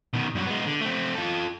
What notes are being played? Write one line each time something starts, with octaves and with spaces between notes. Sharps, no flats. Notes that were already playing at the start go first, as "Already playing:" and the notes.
B2 D#3
G2 F#3
G#3 B3
D3
A3 C4
F4 A4